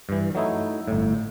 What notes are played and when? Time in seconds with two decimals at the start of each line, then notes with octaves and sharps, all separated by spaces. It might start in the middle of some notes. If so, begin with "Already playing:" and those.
0.09 G2 E3
0.35 F#3 A3 D#4 E4
0.88 G1 A2